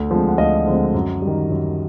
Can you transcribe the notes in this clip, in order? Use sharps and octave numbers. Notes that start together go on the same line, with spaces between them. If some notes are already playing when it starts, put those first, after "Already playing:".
Already playing: D2
D3 F3 G#3 C4
F#5
D2 D#5 F5
D3 F3 G#3 C4
F#2
G3
D#3
F#2